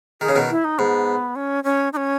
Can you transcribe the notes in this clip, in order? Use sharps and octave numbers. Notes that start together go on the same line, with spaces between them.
D#3 G#4
C#3
B2 D#3
E4
D#4
G#2 B3
C#4
C#4
D#4
C#4